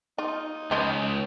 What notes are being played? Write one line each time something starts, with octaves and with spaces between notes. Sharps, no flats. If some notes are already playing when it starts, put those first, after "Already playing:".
D#4 F4
C#2 F3 C#4 D#5